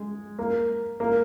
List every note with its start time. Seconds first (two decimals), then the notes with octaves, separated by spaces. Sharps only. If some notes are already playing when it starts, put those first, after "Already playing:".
Already playing: G#3
0.39 A#3
1.00 A#3